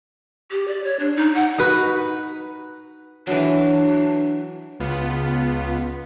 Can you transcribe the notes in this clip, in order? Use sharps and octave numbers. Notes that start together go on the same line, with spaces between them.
G4
D5
C#5
D4
D#4
F#5
D#4 F#4 B4
E3 F#3 D4
C#2 B3 F4